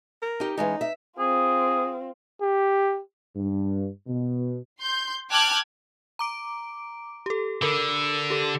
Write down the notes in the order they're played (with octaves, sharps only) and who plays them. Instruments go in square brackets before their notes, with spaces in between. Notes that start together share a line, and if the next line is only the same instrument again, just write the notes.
[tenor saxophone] A#4
[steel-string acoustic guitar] D#4 G4
[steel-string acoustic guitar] E3 G#3 C#4 [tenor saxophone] D#4
[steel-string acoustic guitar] E5
[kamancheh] C4 F4 [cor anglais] G#4
[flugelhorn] G4
[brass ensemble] G2
B2
[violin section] C6 G6
G5 A5 D6 F6 F#6 G#6
[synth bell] A#5 D6 D7
G4 A4
[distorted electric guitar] D3 [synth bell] A4 A#4 B5
[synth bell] G4 A4